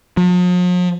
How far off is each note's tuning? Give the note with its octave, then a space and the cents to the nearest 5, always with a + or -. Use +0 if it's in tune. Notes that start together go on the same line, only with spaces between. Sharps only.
F3 +45